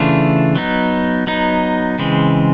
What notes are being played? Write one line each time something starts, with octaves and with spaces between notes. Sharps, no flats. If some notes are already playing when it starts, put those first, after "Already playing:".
Already playing: C#3 E3 A3 D4 F4
F#3 B3 D#4
F#3 B3 D#4
C#3 E3 G#3 C4